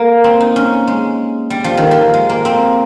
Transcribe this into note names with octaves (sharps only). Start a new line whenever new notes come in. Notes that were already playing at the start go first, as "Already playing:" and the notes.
Already playing: A#3
C4
D#4
C#4
G#3
G3
F3
D#3
F3
G#3
A#3
C4